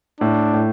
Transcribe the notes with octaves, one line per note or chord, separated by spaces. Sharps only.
A2 D4
A2